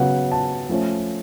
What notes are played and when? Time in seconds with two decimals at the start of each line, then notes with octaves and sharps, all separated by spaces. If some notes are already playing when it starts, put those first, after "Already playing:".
Already playing: C#3 F#3 B3 F#5
0.32 A5
0.69 F3 A3 C#4